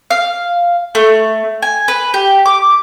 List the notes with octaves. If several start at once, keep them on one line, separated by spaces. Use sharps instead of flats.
F5
A3
G#5
B4
G4
D6